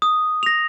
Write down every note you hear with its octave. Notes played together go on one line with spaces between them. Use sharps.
D#6
A#6 F7